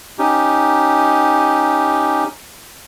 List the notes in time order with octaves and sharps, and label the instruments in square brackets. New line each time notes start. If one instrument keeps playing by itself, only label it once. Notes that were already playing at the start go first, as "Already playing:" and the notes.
[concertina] C#4 D#4 G4